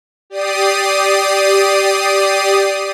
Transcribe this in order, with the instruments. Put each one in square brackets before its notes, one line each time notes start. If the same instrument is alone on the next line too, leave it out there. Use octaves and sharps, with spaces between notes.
[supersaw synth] G4 D5 D#6 C7 D#7